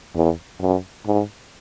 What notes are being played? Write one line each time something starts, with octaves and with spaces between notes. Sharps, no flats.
E2
F#2
G#2